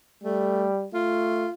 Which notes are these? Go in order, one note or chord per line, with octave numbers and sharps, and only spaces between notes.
G3 A3
A3 F4